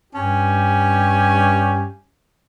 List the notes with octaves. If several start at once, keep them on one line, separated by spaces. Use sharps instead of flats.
G2 C#4 G4 G#5